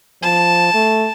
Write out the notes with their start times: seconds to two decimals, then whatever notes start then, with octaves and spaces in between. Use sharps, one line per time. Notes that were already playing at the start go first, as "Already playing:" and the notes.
0.23 F3 A5
0.74 A3